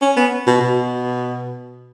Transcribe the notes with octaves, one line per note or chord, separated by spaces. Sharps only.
C#4
B3
B2
B2